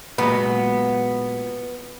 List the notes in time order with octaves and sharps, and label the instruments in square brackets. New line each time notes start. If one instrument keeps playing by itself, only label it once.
[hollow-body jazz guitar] A#2 F#3 G#3 [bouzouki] B3